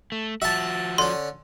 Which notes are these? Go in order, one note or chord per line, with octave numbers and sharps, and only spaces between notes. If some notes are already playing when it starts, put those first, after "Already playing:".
A3
F3 F#4 E5 A5
D3 C#4 C6